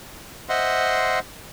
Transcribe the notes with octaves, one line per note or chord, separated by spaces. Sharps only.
C5 D#5 E5 F#5 C6